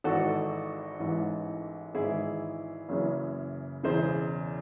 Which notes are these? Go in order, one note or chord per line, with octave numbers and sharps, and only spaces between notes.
G#1 G#2 E3 F#4 A4
A1 G#2 E3
G#1 G#2 E3 E4 G#4
F#1 F#2 C#3 E3
E1 E2 C#3 G#4 C5